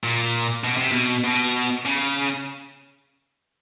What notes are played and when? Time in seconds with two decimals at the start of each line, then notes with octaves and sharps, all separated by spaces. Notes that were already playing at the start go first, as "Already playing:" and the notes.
0.03 A#2
0.64 B2
0.77 C3
0.92 B2
1.24 B2
1.85 C#3